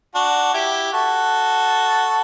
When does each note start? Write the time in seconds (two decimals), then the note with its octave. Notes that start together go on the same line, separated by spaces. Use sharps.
0.15 D4 F#4
0.54 E4 G4
0.93 F#4 A4